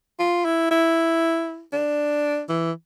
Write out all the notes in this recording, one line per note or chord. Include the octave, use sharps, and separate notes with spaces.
F4
E4
E4
D4
E3